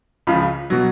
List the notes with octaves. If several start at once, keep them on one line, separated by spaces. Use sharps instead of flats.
C#2 C#3 F3 B5
B2 F#3